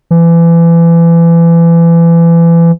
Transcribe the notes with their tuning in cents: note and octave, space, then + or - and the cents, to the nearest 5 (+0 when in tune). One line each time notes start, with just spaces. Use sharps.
E3 +30